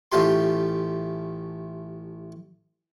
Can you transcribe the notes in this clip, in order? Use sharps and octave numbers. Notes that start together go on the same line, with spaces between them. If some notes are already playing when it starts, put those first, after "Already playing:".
A1 A3 F4 G4 C6